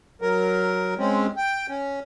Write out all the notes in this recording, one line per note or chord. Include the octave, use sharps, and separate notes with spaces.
F#3 A#4
G#3 C4 C#4
G5
C#4